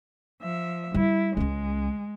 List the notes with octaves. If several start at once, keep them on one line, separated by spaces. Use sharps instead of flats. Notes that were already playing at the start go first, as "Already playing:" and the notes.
F3 E5
G3 E4
C#2 G#3 C#4